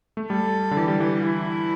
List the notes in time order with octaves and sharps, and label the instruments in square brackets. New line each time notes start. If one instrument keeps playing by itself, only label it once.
[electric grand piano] A3
[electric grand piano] G3 [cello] A4
[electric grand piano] D3
[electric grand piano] E3 [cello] G4
[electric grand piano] G3
E3
[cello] E4